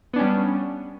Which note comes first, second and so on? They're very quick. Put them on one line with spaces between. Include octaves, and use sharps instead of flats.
B3 D4 C#4 G3